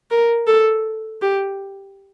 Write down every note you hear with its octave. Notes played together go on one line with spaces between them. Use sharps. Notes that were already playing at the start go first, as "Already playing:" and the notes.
A#4
A4
G4